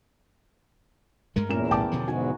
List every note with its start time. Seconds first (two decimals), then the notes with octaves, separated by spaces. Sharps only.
1.36 G2 G#3 A3 A#4
1.49 E2 A#2 C#4 A#4 E7
1.71 B1 A2 G5 A5 D6
1.91 B2 D3 F3
2.08 E2 G#2 D#4 F#4 G#5